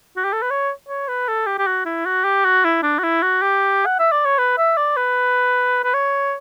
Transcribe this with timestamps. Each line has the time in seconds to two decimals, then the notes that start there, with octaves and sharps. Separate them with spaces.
0.17 F#4
0.25 G4
0.33 A4
0.42 B4
0.51 C#5
0.89 C#5
1.08 B4
1.28 A4
1.47 G4
1.59 G4
1.67 F#4
1.86 E4
2.06 F#4
2.25 G4
2.45 F#4
2.65 E4
2.83 D4
2.99 F#4
3.03 E4
3.22 F#4
3.42 G4
3.86 F#5
3.99 E5
4.12 D5
4.25 C#5
4.38 B4
4.58 E5
4.77 D5
4.97 B4
5.84 B4
5.94 C#5